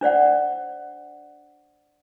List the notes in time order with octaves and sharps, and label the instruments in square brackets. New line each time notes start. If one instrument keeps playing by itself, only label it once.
[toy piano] D4 C5 D5 F#5